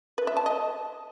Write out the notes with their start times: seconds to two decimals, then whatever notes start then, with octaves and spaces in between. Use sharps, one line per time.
0.18 B4
0.27 E5
0.37 A5
0.46 D#5